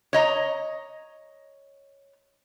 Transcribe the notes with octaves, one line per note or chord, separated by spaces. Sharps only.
C#5 D#5 A#5